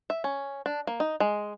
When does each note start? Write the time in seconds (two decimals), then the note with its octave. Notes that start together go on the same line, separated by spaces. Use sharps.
0.10 E5
0.24 C#4
0.66 D4
0.87 A#3
1.00 D#4
1.20 G#3